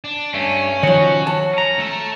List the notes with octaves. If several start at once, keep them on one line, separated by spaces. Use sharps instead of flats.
D4
G2 A3 C#4
D#3 F3 F#3 F#4 C#5
A5
C#4 A#5
A3 A4